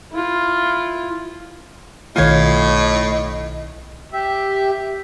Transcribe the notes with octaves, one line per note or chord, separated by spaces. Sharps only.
E4 F4
B1 A2 D#3 F4 C#5 D#5 C7
G4 E5